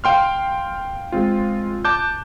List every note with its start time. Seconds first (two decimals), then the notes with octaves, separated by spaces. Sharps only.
0.04 F5 G5 C6 F6
1.12 G#3 C4 F4
1.85 A5 D6 F#6 G6